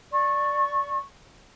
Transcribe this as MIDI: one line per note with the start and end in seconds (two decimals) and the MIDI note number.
0.11 1.00 74
0.11 1.00 85